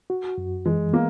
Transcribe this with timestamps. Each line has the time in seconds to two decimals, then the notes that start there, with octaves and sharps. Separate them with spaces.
0.10 F#4
0.38 F#2
0.66 E3 G#3
0.93 A#3 B3